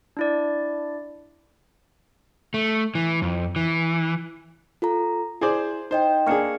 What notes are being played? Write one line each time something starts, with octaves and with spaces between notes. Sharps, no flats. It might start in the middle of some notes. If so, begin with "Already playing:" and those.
D4 E4 D5
A3
E3
F2
E3
F4 A4 A#5
E4 G#4 C5 D5
D#4 C5 D#5 G5
A#3 D4 G#4 C#6 F6 C#7